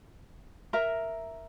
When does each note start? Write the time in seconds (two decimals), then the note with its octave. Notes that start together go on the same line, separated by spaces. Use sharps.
0.73 A#4 E5 A#5